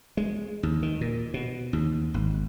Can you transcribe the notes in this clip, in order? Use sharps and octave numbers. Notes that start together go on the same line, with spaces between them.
G#3
D#2
D#3
A#2
B2
D#2
G#1